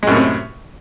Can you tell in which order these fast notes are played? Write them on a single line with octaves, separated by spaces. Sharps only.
G#3 F#2 A2 C3